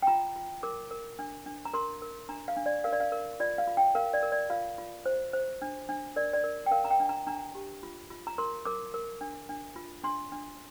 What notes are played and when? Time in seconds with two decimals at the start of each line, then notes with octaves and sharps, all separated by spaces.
0.02 G5
0.07 F4 A#5
0.36 F4
0.63 A#4 D6
0.91 A#4
1.19 D4
1.46 D4
1.65 A#5
1.73 A#4 C6
2.02 A#4
2.29 D4 A#5
2.48 F5
2.57 D4
2.66 D5
2.84 A#4 F5
2.92 D5
3.00 F5
3.12 A#4
3.40 F4 D5
3.58 F5
3.67 F4
3.77 G5
3.95 A#4 F5
4.13 D5
4.23 A#4
4.32 D5
4.50 F4 F5
4.78 F4
5.06 C5
5.33 C5
5.62 D4
5.89 D4
6.16 A#4 D5
6.33 D5
6.44 A#4
6.66 G5
6.71 A#4 F5
6.85 A#5
6.91 G5
7.00 D4
7.09 A#5
7.27 D4 A#5
7.55 G4
7.83 F4
8.10 F4
8.27 A#5
8.38 A#4 C6
8.65 A#4 D6
8.94 A#4
9.21 D4
9.49 D4
9.76 F4
10.04 D4 C6
10.32 D4